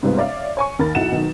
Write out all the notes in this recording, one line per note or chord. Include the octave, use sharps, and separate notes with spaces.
G#2 C3 G3 G#3 B3 F4
C#5 D5 E5 F5
C#5 G#5 C#6
D#2 A#4 B5 A6
B1 F#3 E4 F#5 E7
B2 D#3 F#3